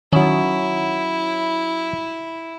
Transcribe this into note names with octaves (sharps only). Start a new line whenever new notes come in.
D#3 F#3 C#4 E4